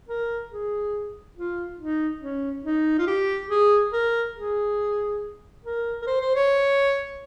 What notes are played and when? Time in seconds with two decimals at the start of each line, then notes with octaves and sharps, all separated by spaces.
0.08 A#4
0.51 G#4
1.36 F4
1.78 D#4
2.21 C#4
2.64 D#4
2.98 F4
3.07 G4
3.50 G#4
3.92 A#4
4.35 G#4
5.65 A#4
6.02 A#4
6.07 C5
6.21 C5
6.35 C#5